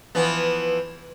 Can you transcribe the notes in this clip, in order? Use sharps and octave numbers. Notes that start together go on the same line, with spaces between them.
E3 F3 B3